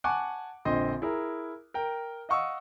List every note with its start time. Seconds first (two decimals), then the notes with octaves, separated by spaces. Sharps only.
0.04 F#5 G#5 A5 C#6 D6 F#6
0.65 A#1 D3 C4 D#5 C6
1.02 E4 G#4 A#4
1.74 A#4 G5
2.29 D#5 F5 F#5 C#6 D#6 E6